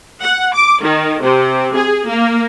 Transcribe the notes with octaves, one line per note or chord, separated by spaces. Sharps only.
F#5
D6
D#3
C3
G#4
A#3